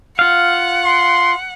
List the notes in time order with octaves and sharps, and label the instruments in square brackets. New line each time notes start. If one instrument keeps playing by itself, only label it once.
[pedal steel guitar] F4 F5 [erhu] F#5
[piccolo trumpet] C6